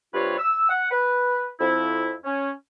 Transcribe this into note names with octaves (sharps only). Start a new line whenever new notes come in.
G2 C3 G3 F4 B4 C#5
E6
F#5
B4
F2 E4
C#4